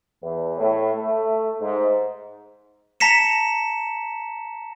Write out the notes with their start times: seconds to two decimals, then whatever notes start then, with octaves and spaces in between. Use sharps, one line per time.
0.21 E2
0.57 A2
0.94 A3
1.60 G#2
3.00 A5 A#5 A#6 B6 C#7 E7